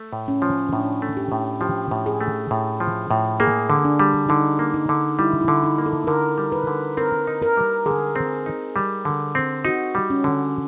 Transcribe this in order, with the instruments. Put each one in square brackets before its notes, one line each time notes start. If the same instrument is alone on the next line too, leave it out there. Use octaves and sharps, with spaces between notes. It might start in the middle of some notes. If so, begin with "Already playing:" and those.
Already playing: [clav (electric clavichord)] A3
A2
[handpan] C#4
[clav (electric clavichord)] F3
[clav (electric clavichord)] A2 [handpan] D4
[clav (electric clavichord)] A3
[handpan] G4
[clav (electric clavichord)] A2
[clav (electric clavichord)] F3 [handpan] G4
[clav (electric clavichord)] A2
[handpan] G#4
[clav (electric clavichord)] A3
A2
F3
A2
[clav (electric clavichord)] A#3 [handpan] G#4
[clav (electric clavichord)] D3
[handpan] D4
[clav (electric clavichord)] G3
[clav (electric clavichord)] D3 [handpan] D#4
[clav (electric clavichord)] A#3
[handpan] D#4
[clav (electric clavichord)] D3
[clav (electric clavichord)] G3 [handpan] E4
[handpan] E4
[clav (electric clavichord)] D3
[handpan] D#4
[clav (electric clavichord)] A#3
[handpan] A4
[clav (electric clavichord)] D3 [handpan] A#4
[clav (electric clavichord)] G3
[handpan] B4
[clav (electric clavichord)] D3
[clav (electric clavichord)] C4 [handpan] A#4
[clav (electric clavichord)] D#4
[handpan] A#4
[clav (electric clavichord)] G3
[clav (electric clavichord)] D3 [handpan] G#4
[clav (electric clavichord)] C4
D#4
G3
D3
C4
[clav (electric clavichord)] D#4 [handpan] F#4
[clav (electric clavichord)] G3
[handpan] C#4
[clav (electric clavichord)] D3